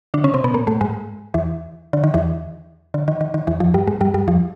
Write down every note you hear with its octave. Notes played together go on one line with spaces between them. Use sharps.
D3 D4
C#3 C#4
C3 C4
B2 B3
A#2 A#3
A2 A3
G#2 G#3
E2 E3
D3
D#3
E2 E3
D3
D#3
D#3
D#3
E2 E3
F2 F3
G2 G3
G#2 G#3
G2 G3
G2 G3
F2 F3